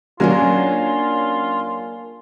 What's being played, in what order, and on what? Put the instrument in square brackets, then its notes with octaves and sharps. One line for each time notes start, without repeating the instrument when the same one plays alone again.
[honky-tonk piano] F#3 C#4 [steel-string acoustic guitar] A#3 D4 G#4 [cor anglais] F4